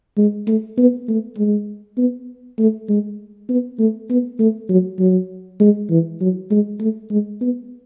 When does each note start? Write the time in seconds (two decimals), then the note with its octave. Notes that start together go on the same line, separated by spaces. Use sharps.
0.17 G#3
0.47 A3
0.78 B3
1.08 A3
1.37 G#3
1.97 B3
2.59 A3
2.89 G#3
3.49 B3
3.79 A3
4.10 B3
4.39 A3
4.69 F#3
4.99 F#3
5.60 G#3
5.90 E3
6.21 F#3
6.51 G#3
6.81 A3
7.11 G#3
7.41 B3